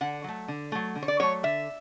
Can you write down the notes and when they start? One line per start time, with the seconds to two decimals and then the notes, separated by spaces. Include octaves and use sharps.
0.01 D3 F#5
0.24 F#3 A3
0.48 D3
0.72 F#3 A3
0.95 D3
1.03 C#5
1.08 D5
1.19 F#3 A3 C#5
1.43 D3 E5